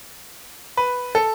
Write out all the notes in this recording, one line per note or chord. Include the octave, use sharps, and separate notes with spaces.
B4
A4